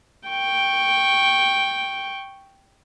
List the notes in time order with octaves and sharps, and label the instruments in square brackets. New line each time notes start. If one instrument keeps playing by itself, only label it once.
[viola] G5 C#6